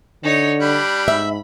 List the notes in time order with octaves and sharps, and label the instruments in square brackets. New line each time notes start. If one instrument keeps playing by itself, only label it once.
[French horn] D3 [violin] D#4 C#5
[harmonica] G3 D4 [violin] B5
[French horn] G#2 [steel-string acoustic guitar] E5